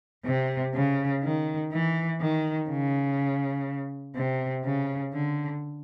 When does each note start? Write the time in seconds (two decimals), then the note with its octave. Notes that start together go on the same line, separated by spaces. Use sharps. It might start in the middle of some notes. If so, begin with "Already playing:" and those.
0.25 C3
0.74 C#3
1.23 D#3
1.72 E3
2.20 D#3
2.69 C#3
4.15 C3
4.64 C#3
5.13 D3